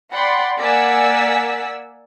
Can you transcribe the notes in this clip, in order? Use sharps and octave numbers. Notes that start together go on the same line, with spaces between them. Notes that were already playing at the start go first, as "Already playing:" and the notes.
D5 F#5 G5 B5 C6
A#3 D5 F#5 G#5 E6 B6